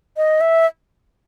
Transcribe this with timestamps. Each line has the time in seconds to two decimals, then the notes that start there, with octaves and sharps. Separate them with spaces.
0.17 D#5
0.41 E5